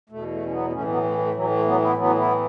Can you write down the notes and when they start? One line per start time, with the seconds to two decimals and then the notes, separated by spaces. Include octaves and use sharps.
0.10 E2 B2 A3
0.30 A3
0.45 C#4
0.51 F#3 B3
0.72 A2 E3 A3 C#4
0.88 F#3 B3
1.03 A3
1.19 A3
1.34 A2 E3 F#3
1.50 A3
1.65 F#3 B3
1.81 B3 E4
1.97 A2 E3 F#3 B3
2.18 B3 E4